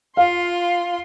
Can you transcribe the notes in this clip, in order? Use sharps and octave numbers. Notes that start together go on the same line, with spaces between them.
F4 F5 C6